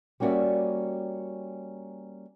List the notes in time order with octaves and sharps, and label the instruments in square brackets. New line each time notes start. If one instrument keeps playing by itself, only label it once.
[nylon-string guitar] G3 A#3 C#4 F#4 D5 E5